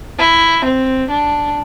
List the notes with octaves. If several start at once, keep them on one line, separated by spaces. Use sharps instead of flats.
E4
C4
D4